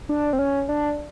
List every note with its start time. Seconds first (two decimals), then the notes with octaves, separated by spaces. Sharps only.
0.09 D4
0.33 C4
0.39 C#4
0.69 D4